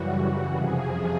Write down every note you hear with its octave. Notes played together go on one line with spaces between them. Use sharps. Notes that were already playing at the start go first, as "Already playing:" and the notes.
Already playing: F#2 C#3 E3 G3 F#4
F#4
F2 C3 F3 G#4